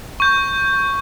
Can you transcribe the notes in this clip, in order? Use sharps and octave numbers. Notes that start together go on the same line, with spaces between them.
C#6 G6